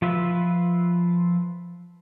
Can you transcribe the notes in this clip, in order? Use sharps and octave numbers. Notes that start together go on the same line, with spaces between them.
F3 F4 B4 E5